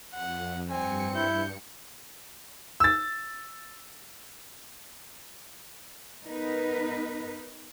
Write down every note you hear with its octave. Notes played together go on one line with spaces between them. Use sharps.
F2 F#5
G2 C4 G#5 C#7
E4 G6
E6 A6
B3 D#4 A#4 B4